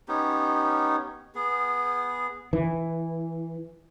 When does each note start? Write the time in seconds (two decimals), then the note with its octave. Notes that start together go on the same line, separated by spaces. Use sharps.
0.08 B3 C#4 D#4 G4
1.35 B3 G#4
2.53 E3